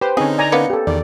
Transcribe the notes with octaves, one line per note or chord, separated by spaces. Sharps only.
G4 B4 C5
D3 C4 C#4 D#4 G#4
D5 G#5 A#5
A#3 B3 C#4 C#7
G4 A4
E2 D#3 D5